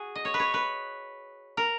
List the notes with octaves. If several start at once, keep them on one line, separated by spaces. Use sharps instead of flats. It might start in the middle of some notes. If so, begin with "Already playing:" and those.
Already playing: F#4 G#4
D#5
C#5
B4
C#5
B4
A#4